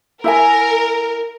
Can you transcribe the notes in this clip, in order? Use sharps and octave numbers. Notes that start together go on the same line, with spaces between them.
E4 A#4 E5 G#5